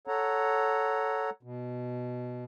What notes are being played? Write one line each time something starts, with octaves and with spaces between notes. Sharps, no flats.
A4 C#5 F#5 A#5
B2